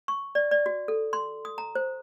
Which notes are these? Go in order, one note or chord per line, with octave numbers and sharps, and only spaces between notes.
C#6
D5
D5
F#4
A4
C6
D#6
A#5
C5